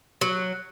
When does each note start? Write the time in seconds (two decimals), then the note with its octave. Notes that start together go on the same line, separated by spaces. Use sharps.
0.21 F#3